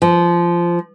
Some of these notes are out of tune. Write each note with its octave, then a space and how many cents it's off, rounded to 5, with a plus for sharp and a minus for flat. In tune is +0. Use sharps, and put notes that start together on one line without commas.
F3 -15